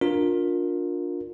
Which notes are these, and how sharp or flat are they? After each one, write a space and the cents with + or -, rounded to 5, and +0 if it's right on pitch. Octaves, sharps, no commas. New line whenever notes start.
D4 +0 F4 +25 A#4 +5